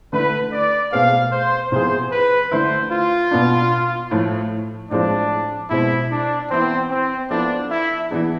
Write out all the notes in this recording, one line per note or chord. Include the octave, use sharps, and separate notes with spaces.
D3 A3 E4 B4
D5
B2 A3 C4 G#4 B4 F5
C5
C3 F3 B3 E4 G#4 C5
B4
D3 A3 E4 C5
F4
B2 B3 D4
A2 F3 A3
A2 F3 G#3 C4 D4
B2 G#3 C4 E4
D4
E3 B3 C4 E4
C4
F3 B3 D4 E4 A4 C5
E4
E3 B3 D4 G#4